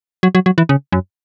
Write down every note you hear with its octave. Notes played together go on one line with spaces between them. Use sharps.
F#3
F#3
F#3
E3
C#3
F#2